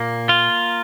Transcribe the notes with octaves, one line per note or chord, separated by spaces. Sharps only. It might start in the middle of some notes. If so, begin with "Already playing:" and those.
Already playing: A#2 A#3
F4